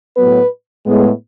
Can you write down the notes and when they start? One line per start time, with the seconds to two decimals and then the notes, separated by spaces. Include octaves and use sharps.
0.16 A2 F#3 B3 B4
0.86 A2 G#3 B3